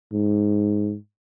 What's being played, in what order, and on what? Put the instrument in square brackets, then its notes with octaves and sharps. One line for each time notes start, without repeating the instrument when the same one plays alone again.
[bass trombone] G#2